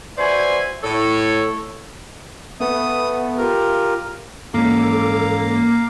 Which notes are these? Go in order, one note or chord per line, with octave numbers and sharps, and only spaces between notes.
F#4 B4 C5 D5 E5 G#5
A2 A4 C#5
A3 B3 D#6
F4 G4 A#4
G#2 E3 A#3 C#4 A4 F5 A#5 D6